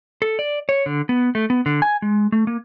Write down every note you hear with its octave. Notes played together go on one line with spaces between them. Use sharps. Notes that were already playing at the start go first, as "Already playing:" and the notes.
A4
D5
C#5
D3
B3
A3
B3
D3
G#5
G#3
A3
A#3